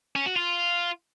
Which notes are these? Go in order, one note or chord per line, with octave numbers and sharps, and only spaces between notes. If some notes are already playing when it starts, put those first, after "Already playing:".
C#4
F#4
F4